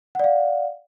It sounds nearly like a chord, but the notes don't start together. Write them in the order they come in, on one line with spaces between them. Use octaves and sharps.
F#5 D5 F5